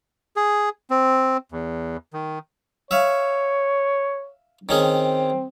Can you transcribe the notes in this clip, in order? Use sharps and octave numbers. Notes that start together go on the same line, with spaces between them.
G#4
C4
E2
D#3
C#5 E5 F5
D#3 C4 C#4 G#4